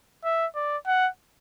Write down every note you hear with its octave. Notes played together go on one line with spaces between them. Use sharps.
E5
D5
F#5